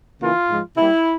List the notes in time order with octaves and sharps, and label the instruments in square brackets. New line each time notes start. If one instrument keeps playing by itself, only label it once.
[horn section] C#3 E3 A#3 F4
G#2 F3 G#3
C3 G3 A#3 E4